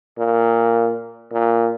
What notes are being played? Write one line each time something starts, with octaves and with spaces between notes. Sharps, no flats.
A#2
A#2